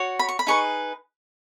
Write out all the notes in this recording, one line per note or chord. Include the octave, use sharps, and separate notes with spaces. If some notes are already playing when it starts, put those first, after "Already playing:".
Already playing: F#4 C#5
B5
C#6
B5
D#4 G#4 B4 C#6